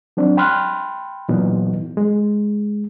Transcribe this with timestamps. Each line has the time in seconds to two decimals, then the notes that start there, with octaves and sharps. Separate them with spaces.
0.17 F#3 C4 D4
0.37 G5 B5 C6 F6 F#6
1.29 A#2 E3 F#3 B3 D#4
1.97 G#3